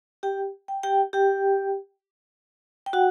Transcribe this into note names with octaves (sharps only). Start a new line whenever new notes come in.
G4 G5
G5
G4 G5
G4 G5
G5
F#4 F#5